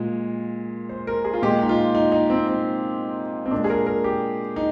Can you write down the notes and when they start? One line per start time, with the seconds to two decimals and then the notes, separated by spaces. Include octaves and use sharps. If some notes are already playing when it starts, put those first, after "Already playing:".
Already playing: A#2 G#3
0.89 C5
1.07 A#4
1.25 G#4
1.34 F4
1.42 A#2 G#3 G4
1.62 D#4
1.69 F4
1.95 D#4
2.12 D#4
2.30 C4
2.47 C4
3.46 C4
3.51 A#2 G#3 D4
3.64 G#4
3.70 A#4
3.86 A#4
4.04 G4
4.56 D#4